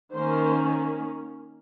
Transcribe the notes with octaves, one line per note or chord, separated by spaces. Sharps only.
D#3 A#3 C#4 C5